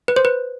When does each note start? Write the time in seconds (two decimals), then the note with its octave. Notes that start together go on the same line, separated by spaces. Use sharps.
0.08 B4
0.16 C5
0.25 B4